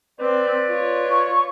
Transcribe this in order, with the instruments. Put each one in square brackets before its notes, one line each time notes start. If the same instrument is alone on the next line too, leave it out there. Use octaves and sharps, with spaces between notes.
[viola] C4 [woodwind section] B4 D5
[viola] F4 C#5
[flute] C#6